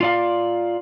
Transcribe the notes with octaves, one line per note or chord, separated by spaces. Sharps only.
F4 D5 F5